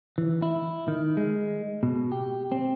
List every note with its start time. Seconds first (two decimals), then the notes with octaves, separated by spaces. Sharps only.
0.18 E3
0.42 E4
0.88 D#3
1.17 G#3
1.83 B2
2.12 G4
2.52 C4